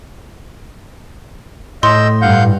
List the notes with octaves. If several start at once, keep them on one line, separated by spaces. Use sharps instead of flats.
A2 D#5 C6 E6 G6
G2 F5 F#5 G6